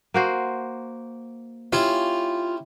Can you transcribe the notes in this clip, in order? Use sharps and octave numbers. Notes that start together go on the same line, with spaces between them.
A#3 F#4 C5
C#4 E4 F4 G4